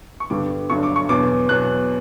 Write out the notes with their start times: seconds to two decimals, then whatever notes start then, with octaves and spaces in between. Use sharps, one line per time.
0.20 C#6
0.30 G2 D3 G3 B3 D6
0.70 G1 G2 D3 F#3 C#6
0.83 D6
0.96 C#6
1.09 E2 B2 F#3 B3 D6
1.49 E2 B2 F#3 B3 F#6